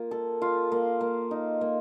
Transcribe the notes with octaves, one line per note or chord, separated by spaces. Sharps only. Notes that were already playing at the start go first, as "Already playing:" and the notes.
Already playing: A#3 F4
A4
F4
A#3
A#3
D#4
A#3